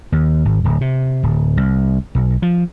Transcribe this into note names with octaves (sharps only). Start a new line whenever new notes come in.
D#2
G#1
D1
C3
D1
C2
B1
F3